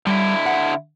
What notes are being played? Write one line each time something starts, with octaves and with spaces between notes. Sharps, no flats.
D3 G3 E4
F#5